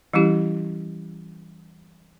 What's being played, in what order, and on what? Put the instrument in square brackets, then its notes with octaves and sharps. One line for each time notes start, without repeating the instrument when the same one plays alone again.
[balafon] E3 G3 C#4 E4 G4